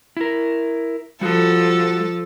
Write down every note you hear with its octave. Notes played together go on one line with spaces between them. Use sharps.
E4 A#4
F3 G3 F#4 A4